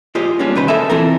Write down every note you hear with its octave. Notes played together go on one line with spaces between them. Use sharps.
F4 G4 G#4 C5 D5 D#5
G3 A#3 B3 C#4 D4
C2 D#3 B4 C5 B5
A4 A#4 C5 D#5 E5 G#5
E3 F3 C4 A4 A#4